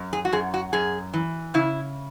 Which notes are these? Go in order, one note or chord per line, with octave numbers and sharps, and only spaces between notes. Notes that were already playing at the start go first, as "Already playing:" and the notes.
Already playing: F#2
G#4
F#4
F#2 G#4
F#4
F#2 G#4
E3
C#3 E4